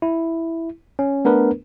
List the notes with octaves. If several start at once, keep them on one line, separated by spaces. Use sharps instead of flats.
E4
C#4
A3 B3 D4 A#4 B4